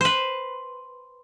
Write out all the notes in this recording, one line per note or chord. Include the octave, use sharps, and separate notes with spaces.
B4 C5